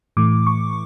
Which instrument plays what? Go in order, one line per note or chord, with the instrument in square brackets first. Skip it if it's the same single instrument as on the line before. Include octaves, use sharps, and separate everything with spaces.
[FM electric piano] A2 E3 A3 D6
C#6